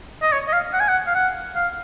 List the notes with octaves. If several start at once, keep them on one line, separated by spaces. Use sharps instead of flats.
D#5
C#5
D#5
F5
F#5
G#5
F#5
F5
F#5
F5